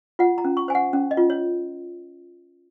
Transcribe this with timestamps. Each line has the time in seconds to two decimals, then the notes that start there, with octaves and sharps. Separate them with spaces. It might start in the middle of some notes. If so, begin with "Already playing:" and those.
0.19 F4 F#5
0.38 A#5
0.45 C#4
0.57 C#6
0.68 C5 G#5
0.75 F#5
0.93 C#4
1.11 D#5
1.17 F4
1.30 C#5